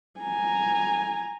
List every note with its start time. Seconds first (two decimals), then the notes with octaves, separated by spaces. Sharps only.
0.20 G#5 A#5